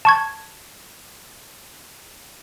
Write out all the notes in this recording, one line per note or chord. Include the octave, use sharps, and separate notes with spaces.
A5 C#6 G#6